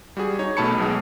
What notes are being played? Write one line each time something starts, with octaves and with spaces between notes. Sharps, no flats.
G3 F#4 G#4
D#4 C#5
B1 B2 A3 A5 B5 C#7
B1 B2 F#3 G#3